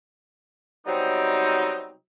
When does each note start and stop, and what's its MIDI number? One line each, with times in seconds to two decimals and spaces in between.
0.86 1.93 48
0.86 1.93 54
0.86 1.93 55
0.86 1.93 59
0.86 1.93 60
0.86 1.93 63